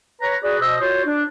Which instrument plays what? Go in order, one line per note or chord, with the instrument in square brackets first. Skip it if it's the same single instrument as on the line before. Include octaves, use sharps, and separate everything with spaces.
[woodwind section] B4 C#5 A#5
F#4 G#4 B4 D5
B2 C5 D#5 E6
F4 F#4 C5 C#5
D4